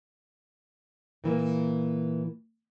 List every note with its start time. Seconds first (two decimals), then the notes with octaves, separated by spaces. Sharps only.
1.24 A#2 E3 A#3